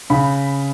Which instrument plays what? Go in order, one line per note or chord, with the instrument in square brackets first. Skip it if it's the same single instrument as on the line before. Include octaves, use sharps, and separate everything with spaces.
[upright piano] C#3 B5